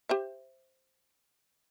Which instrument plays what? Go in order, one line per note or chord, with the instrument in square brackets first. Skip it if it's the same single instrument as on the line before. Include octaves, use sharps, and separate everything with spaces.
[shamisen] G4 C5 E5